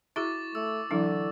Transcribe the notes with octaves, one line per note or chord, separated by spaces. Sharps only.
E4 F#4 G#4 E5 C#6 D6 A6
A3 E6
D3 E3 F#3 D4 E4